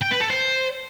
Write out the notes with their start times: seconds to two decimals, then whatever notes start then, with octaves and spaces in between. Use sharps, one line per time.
0.02 G5
0.11 B4
0.21 A4
0.30 C5